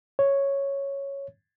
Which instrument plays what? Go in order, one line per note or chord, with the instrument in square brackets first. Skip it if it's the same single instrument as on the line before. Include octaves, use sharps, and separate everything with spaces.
[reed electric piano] C#5